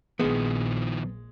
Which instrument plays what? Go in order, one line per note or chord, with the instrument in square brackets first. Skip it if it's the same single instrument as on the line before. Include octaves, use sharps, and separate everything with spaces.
[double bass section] A#1 [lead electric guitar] D#3 F3 [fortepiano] G#3 [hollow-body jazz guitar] B3